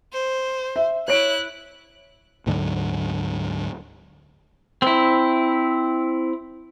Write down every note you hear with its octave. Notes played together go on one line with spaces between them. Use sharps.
C5
E5
E4 C#5 F#6 D7
D2 G#2 D3 F#3
C4 E4